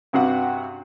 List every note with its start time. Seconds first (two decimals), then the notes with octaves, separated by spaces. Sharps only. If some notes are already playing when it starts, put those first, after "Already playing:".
0.13 G2 C3 F#4 F#5